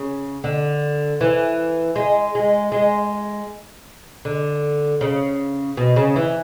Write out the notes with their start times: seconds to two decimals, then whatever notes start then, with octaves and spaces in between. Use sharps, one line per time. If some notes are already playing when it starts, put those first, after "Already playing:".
Already playing: C#3
0.44 D3
1.21 E3
1.96 G#3
2.35 G#3
2.72 G#3
4.25 D3
5.01 C#3
5.77 B2
5.96 C#3
6.16 E3